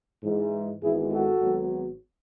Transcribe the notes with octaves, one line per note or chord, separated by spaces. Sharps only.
G#2 E3 G#3
G#1 G#2 E3 G#3 B3 E4 G#4
F#4 A4
G#1 G#2 F#3 B3